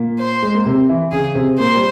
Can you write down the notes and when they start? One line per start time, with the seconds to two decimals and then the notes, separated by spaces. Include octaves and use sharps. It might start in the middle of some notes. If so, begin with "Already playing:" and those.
Already playing: A#2 A#3
0.19 C5
0.42 G#3
0.54 A#3
0.65 C3 C4
0.89 E3 E4
1.12 C#3 C#4 G#4
1.35 C3 C4
1.59 A#2 A#3 C5
1.75 G3